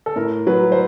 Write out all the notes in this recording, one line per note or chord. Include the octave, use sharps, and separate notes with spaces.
A4
A2 A#4
F#3 B4
C5